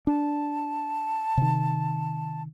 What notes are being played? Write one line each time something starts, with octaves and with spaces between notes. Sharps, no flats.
D4 A5
C3 D#3